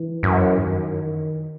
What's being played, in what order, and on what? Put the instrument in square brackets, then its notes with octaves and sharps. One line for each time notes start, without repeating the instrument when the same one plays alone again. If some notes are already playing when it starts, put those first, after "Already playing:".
Already playing: [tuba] E3
[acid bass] F#2
[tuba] D#3